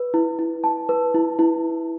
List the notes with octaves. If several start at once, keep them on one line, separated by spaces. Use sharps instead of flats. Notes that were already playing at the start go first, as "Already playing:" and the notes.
Already playing: B4
E4
E4
A5
B4
E4
E4